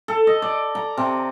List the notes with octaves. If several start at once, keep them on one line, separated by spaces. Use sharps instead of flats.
A4
D#5
D5
A#5
C3